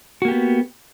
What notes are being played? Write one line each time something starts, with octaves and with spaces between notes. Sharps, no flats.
A#3 B3 F#4 G4